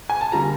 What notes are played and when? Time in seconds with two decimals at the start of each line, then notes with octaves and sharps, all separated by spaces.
0.10 G#5
0.21 A5
0.32 D3 G3 A#3 A#5